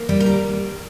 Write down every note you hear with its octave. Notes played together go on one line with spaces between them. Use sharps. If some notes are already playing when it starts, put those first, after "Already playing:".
Already playing: A#3
G3 G4
A#4
G3